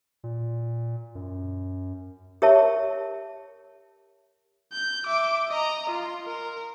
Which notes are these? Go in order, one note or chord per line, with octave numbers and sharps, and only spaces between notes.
A#2
F#2
G4 A#4 C#5 E5 A5
G6
E5 D6
D#5 A#5
F4 C6
A#4